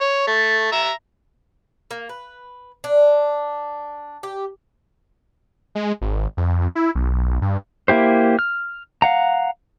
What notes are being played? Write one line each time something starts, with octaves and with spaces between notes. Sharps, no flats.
C#5
A3
E5 A#5 E6
A#3
B4
D4
G4
G#3
G#1
F2
E4
B1
G2
A#3 E4 G4 C5
F6
F5 F#5 A#5